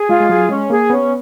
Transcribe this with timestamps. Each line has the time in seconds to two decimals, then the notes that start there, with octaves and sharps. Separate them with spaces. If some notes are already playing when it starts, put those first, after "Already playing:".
Already playing: G#4
0.09 G#3 F4
0.21 G#3
0.29 F#3 G#4
0.49 G#3 C#4
0.70 A#3 G#4
0.90 B3 C#4